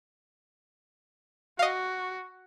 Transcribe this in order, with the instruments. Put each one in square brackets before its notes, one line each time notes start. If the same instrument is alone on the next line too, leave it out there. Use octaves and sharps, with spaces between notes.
[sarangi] F#4 [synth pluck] D#5 F5